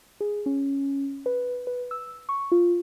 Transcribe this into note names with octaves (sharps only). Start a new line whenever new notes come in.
G#4
C#4
B4
B4
E6
C#6
F4